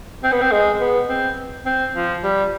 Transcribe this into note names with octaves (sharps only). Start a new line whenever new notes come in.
C4
B3
C4
G#3
B3
C4
C4
F3
G3